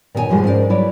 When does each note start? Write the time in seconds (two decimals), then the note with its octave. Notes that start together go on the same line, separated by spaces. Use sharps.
0.15 A#2 D#3 D#4 G#4 C#5 G#5
0.29 F#2 A2 F3 G3 G#3
0.44 G#2 C#4 F#4 A#4 D5
0.69 F#3 E4 B4 C#5 D5